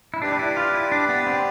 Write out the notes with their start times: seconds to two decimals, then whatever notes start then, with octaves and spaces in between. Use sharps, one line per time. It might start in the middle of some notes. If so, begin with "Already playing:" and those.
0.14 E4
0.22 D4 G4 B4 D5
0.32 D4
0.39 E4
0.57 F4
0.74 E4
0.92 D4
1.09 B3
1.27 C4